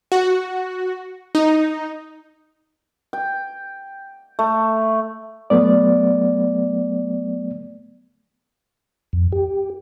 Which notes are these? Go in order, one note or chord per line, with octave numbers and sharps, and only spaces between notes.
F#4
D#4
G5
A3
F#3 A3 B3 D5
F2
G4